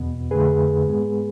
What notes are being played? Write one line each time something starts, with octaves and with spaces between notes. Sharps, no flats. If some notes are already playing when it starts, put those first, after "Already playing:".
Already playing: E2 B2 B3
F2 D3 A3 G#4 B4
G#2 G#3 B3